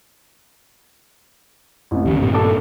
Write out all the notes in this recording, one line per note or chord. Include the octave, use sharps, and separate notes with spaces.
A1 C3
D2 D#3 C#4
G2 A#2 C4
A4 A5 D6